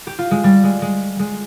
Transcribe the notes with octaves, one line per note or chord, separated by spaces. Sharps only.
G4
F4
G#3
G3
G#3
G#3
G#3